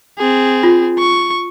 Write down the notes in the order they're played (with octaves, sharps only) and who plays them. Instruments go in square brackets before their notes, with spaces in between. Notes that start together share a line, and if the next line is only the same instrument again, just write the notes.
[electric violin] C4 G#4
[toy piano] F4
[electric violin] C#6